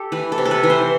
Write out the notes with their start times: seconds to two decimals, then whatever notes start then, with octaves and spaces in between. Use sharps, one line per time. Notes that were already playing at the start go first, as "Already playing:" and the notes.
Already playing: G4 A4
0.12 E3 B4
0.32 A4
0.38 C3
0.45 A4
0.51 B4
0.63 E3
0.70 C5